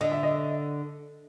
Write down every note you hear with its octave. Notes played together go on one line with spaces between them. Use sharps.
D3 D#5
E5
D#5